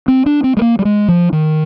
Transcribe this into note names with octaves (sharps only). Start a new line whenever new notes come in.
C4
D4
C4
G#3
A#3
G3
G#3
F3
D#3